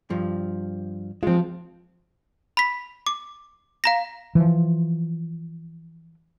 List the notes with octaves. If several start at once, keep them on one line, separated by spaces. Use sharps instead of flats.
G2 F3
F3 G#3 C4 F4
B5 B6
D6
F5 A#5 A#6
E3 F3